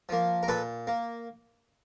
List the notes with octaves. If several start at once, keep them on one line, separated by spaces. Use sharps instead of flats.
F3 A#3
A#4
A#2 A4 B4
A#3